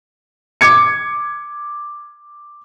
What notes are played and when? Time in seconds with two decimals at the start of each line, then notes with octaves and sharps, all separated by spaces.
0.61 D6 G#6 C#7